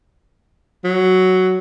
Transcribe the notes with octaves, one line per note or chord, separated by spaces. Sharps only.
F#3